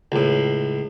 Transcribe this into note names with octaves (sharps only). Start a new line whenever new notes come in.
C#2 A2